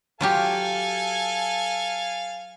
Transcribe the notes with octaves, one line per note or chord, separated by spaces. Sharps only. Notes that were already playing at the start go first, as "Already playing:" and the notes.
F#3 F4 G4 A4 F5 G#5